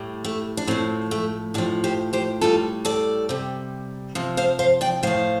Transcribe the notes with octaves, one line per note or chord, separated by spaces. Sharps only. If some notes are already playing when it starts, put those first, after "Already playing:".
Already playing: A2 G3
A3
D4
A2 F3 C4
A3
A2 F3 D4 G4
G4 C5
G4 C5
A2 G3 F4 A4
A4 D5
C3 G3
C3 F3
C5 F5
C5 F5
D5 G5
A2 F3 C5 F5